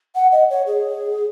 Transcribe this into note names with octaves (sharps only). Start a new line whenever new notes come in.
F#5
D#5
C#5
G#4